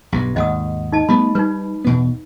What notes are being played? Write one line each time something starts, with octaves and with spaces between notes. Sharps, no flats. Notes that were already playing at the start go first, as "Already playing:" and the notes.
B1 G2
G#1 D#2 D#5 F#5 D#6
D#4 D#5 A5
G3 A3 B3 B5
G3 D#4 B4
E2 B2 B3